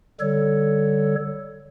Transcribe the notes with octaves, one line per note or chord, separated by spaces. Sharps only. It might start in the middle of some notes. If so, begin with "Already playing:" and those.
D3 G3 A4 C#5